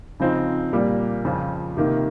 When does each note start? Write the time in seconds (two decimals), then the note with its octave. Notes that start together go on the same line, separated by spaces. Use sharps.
0.20 C#3 F3 C4 D#4
0.72 A#2 G3 A#3
1.25 F2 C#3 F3
1.77 C3 D#3 A#3